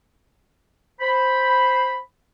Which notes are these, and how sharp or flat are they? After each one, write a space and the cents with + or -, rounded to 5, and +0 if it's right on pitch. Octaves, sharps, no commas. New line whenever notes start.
C5 +0 B5 +0